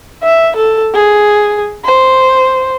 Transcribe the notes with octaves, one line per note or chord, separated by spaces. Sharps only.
E5
A4
G#4
C5